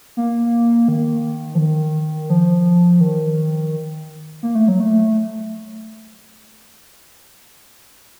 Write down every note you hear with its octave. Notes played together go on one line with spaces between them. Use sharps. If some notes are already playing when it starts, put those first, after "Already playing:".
A#3
D#3
F3
D#3
F3
D#3
A#3
A3
F#3
A3